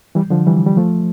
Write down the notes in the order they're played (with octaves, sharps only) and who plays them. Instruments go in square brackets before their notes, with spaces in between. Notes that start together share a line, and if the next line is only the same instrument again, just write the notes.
[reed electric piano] E3 G3
D3 F3
E3 G3
G3
F3 A3